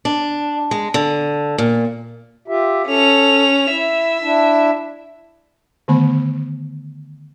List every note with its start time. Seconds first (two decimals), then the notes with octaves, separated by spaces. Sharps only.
0.05 D4
0.71 G#3
0.94 D3
1.58 A#2
2.48 F4 G4 E5
2.87 C#4 A4 F7
3.70 E4 E5
4.23 D4 E4
5.88 D3 D#3 A3 B3 B5